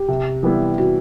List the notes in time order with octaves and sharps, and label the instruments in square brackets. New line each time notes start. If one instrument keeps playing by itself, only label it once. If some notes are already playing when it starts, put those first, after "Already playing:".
Already playing: [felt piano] G4
[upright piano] C3
E3 G3 B3 E4
[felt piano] F#4